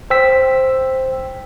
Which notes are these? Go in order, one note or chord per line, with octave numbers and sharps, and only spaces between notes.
C5 G5 E6 B6